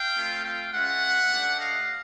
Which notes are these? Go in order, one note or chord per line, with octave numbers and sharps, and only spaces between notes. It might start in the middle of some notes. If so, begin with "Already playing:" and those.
Already playing: F5 G5
A3 C4 F4
F5 G5
G#3 C#4 F4 E5 F#5
A3 D4 G4
D#5 F5